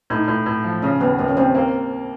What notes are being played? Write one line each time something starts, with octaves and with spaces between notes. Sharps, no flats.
A2 D#4
A2
A2
F3
C#3 C#4
D#2 B3
D#2 A#3
C#4
D#2 C4
A#3 C4